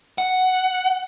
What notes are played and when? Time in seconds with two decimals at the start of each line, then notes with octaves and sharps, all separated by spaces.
0.18 F#5